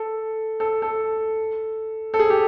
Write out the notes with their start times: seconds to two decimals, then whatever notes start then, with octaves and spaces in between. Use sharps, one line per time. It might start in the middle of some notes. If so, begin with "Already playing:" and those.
Already playing: A4
0.60 A4
0.82 A4
2.14 A4
2.19 G#4
2.30 G4